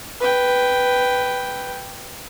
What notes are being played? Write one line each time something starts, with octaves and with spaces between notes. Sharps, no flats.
B4 G5